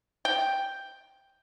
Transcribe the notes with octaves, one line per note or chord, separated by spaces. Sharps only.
G5